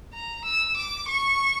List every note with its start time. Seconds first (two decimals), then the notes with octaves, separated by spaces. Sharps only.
0.13 A#5
0.45 E6
0.77 D6
1.08 C#6